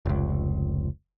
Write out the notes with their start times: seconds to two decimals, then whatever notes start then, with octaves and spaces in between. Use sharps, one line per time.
0.06 F1 C#2